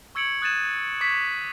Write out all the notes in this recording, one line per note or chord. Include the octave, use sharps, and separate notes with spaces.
C#6 E6 G#6 C#7 D7 F#7
D#6 F#6 G#6 A6 D#7 E7
C#6 D6 G#6 B6